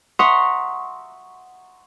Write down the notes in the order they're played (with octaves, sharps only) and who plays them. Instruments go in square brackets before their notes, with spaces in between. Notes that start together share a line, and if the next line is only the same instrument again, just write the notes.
[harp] E5 F#5 A#5 C6 C#6 D#6